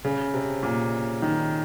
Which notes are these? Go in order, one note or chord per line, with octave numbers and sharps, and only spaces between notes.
C#3
C3
A#2
D#3